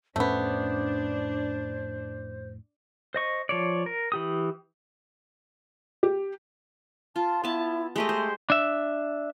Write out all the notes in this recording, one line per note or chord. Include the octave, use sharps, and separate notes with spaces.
F2 A2 A3 B3 C#4 D4 C5
C5 D#5 C#6
F3 C#5 D5
A#4
E3 G4 D#6
G4
F4 A5
B3 E4 A5
G#3 A3 G4 D#5
C5
D4 E5